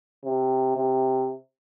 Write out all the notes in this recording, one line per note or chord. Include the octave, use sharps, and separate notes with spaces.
C3
C3